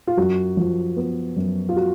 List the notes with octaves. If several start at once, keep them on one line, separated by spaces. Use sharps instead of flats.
F4
F#2 F#4
F3
B3
F#2
F4
F#4